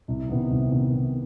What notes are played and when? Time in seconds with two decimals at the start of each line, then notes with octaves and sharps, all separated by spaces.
0.08 C2
0.29 C3 D#3 B3
0.50 C2
0.71 C3 D#3 B3
0.93 C2